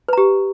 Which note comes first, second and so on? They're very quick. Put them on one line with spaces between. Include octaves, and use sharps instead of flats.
B4 A#5 G4